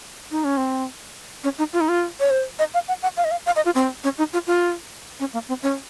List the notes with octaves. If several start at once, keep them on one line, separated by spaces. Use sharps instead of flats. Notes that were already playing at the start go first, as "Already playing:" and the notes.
D#4
C#4
C4
C#4
D#4
F4
D#4
F4
C#5
C5
D#5
F5
F#5
F#5
F5
D#5
F5
F5
D#5
F4
C4
C#4
D#4
F4
F4
C#4
A#3
C4
C#4